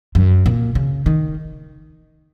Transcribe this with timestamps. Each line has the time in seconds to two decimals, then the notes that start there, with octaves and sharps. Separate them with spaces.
0.15 F#2
0.46 A#2
0.75 C#3
1.06 D#3